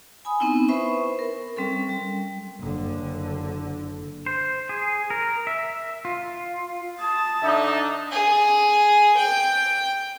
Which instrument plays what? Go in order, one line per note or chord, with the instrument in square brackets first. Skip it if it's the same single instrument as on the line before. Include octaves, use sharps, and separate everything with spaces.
[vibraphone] G#5 B5 D#6
B3 C4 D#4 E4
B4 C5 E5 B5 C#6
A#4
G3 C4 C#4 A4
G3
[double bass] F#1 D3
[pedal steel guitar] C5
G#4
A#4
E5
F4
[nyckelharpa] A5 [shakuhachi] D#6
[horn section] D3 D4 D#4 [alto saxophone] E5
[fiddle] G#4
G5